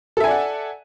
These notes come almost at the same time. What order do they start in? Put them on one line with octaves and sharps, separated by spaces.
A4 E5 G#5 D5 F#5